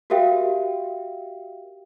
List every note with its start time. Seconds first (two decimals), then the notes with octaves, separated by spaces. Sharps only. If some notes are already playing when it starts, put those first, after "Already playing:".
0.10 F#4 G4 A#4 E5 F5 G5